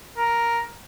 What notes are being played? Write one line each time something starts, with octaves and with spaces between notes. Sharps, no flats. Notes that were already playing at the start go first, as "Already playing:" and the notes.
A#4